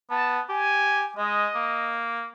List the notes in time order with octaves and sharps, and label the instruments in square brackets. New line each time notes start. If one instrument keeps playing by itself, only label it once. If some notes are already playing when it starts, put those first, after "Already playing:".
[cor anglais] B3 [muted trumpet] A5
[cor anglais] G4 [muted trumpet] G#5
[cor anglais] G#3 [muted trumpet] D#5
[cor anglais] A#3